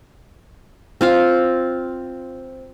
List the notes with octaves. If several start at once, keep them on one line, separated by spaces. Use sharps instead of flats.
C4 F4 F5